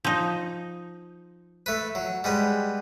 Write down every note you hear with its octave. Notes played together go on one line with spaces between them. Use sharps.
F3 D#4
A3 B4
F#3
G3 G#3 B3